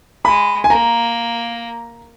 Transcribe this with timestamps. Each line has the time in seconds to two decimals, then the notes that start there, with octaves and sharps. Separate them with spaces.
0.25 G#3 B5
0.64 G#5
0.70 A#3 A#5